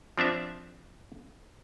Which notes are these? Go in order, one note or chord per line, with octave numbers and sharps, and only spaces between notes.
F3 C4 D4 E5